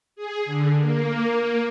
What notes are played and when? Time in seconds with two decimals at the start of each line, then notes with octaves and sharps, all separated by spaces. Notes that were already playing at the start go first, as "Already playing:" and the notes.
0.16 G#4
0.45 D3
0.79 A#3